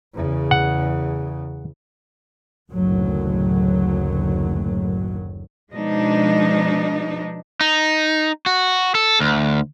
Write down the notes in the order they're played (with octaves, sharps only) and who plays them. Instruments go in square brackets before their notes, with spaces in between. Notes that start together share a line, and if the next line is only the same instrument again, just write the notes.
[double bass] E2 C#3
[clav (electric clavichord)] F#5
[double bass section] F#1 D2 A2 D#3 F#3
[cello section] B2 F3 G#3 D4 D#4
[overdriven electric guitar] D#4
F#4
A4
D2